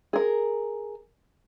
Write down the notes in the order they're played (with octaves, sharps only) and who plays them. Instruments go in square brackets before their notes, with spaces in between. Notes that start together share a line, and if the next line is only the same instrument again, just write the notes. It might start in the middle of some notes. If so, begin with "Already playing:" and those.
[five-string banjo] G#4 A#4